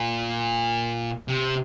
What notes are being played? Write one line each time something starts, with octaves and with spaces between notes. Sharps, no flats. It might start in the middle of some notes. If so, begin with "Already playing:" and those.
Already playing: A#2
C3